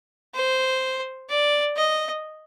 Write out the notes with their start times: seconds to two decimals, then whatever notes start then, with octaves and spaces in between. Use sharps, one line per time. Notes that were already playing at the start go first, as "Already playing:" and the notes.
0.34 C5
1.29 D5
1.76 D#5